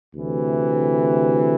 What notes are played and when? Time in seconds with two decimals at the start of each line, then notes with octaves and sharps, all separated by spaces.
0.13 D2 C3 E3